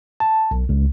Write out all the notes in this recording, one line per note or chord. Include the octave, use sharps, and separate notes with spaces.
A5
B1
C#2